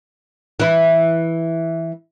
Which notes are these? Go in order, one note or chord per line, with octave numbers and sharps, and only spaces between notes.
E3 E4